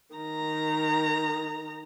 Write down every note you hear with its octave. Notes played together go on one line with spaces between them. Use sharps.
D#3 A#5